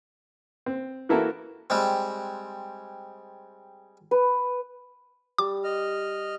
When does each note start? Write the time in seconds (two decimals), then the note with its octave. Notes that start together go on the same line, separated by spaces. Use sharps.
0.66 C4
1.09 E3 A#3 E4 F#4 A4 A#4
1.70 G3 G#3 C4
4.11 B4
5.38 G3 D6
5.64 D#5 F6